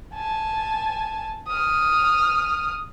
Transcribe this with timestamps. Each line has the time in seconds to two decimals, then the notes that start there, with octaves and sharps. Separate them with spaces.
0.15 G#5 A5
1.48 D#6 F6